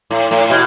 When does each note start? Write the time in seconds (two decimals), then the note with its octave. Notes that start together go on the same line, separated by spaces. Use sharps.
0.11 A2
0.31 A2
0.50 B2